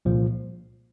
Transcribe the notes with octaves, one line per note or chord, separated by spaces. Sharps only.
C2 A#2 F3